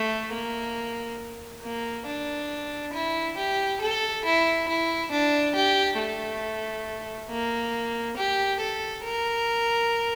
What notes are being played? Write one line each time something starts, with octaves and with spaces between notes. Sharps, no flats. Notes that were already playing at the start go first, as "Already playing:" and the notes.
Already playing: A3
A#3
A#3
D4
E4
G4
A4
E4
E4
D4
G4
A3
A#3
G4
A4
A#4